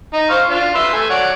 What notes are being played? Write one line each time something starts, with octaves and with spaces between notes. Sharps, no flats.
D#4
C5 F5 C#6
D4 F4
B4 E5 C6
A3 G#5
C#5 D5 F#5